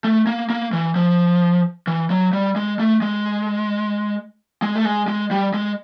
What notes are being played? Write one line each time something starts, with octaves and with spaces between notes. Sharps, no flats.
A3
A#3
A#3
E3
F3
E3
F#3
G3
G#3
A3
G#3
G#3
A3
G#3
G#3
G3
G#3